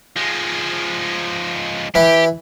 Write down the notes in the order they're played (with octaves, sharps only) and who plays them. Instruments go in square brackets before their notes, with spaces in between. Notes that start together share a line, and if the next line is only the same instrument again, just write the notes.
[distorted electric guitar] F3 G#3
[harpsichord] E3 [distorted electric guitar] G4